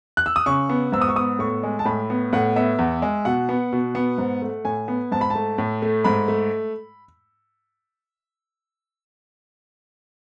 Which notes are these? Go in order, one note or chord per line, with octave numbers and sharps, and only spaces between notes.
F#6
E6
D#6
C#3 C#6
B3
G#2 E6
D#6
C#6
B3 D#6
A2 C#6
G#3
A5
A2 B5
B3
A2 F#5
B3 E5
E2
G#3
B2 F#5
B3
B2
B3
G#2
A3
A2 G#5
B3
G#2 A5
B5
A3 A5
A2
A3
G#2 B5
A3